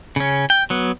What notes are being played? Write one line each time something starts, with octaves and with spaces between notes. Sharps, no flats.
C#3 C#4
G5
F#3 B3